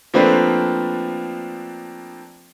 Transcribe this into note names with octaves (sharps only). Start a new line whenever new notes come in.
F3 A3 A#3 C4 D4 B4